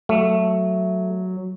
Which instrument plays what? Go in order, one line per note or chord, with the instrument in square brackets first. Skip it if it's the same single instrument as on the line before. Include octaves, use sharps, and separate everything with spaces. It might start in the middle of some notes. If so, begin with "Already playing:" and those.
[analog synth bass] F#3 [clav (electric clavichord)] A3